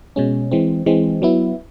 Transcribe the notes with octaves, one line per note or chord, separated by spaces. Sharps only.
B2 G#3 C#4
E3 G#3 C4
E3 G#3 C4
F#3 B3 E4